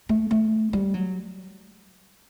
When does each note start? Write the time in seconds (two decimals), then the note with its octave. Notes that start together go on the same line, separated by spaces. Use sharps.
0.09 A3
0.31 A3
0.73 G3
0.94 F#3